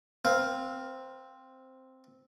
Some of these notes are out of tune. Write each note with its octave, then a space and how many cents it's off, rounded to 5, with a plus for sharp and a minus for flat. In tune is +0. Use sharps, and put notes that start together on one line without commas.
C4 +0 B4 -40 F5 +5